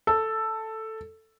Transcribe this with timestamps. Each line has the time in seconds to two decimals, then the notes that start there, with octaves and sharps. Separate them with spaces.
0.07 A4